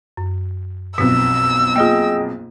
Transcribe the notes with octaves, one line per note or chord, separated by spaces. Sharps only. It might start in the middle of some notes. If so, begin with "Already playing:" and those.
F#2
B1 F2 B2 E6 B6
A#3 F4 G#4 D#5 G5